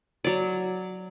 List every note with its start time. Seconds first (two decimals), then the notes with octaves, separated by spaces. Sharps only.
0.24 F#3 D5